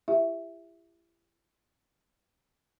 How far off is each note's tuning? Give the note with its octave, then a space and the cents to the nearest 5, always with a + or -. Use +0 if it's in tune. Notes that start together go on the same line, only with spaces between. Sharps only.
E4 +40 G4 +25 E5 +0